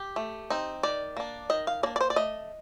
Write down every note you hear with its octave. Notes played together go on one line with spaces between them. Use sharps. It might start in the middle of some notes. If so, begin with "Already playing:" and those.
Already playing: G4
A3
C4 D#4
D#3 D5
A#3 D4
D#3 D#5
F5
A#3 D4 D5
D5
C5
D5
A3 D#5